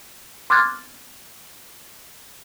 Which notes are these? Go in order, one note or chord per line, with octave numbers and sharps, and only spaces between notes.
C6 D6 F6 F#6 G#6 A6